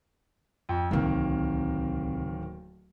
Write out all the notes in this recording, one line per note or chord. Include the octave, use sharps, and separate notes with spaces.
F2
D1 C2 C3 D#3 A#3